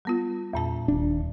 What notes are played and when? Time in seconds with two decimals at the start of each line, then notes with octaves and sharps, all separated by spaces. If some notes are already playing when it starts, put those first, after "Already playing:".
0.05 G3 B3 F4
0.53 E2 A#2 A5
0.88 D#1 D4